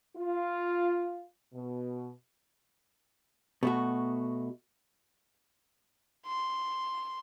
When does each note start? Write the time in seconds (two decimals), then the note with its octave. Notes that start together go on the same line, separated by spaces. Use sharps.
0.16 F4
1.53 B2
3.63 B2 A3 F#4
6.26 C6